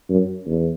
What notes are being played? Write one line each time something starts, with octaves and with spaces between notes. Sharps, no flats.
F#2
E2